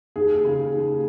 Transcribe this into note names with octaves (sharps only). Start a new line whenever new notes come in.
D#2 G#4
C#3
D#2